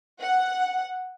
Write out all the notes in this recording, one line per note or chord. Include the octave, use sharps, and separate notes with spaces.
F#5